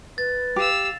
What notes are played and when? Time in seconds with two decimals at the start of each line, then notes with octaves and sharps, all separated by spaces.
0.18 B4 A6
0.56 G4 F5 E6